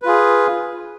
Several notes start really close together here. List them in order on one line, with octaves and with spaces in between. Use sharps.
B4 F4 G#4